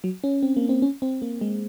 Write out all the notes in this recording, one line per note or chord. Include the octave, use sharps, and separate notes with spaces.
F#3
C#4
C4
A#3
C4
C#4
C4
A#3
G#3